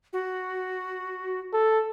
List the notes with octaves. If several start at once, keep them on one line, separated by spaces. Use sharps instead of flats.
F#4
A4